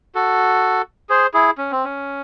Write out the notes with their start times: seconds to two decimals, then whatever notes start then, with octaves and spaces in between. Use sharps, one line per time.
0.15 F#4 A4
1.09 G#4 C5
1.34 E4 G#4
1.58 C#4
1.71 C4
1.84 C#4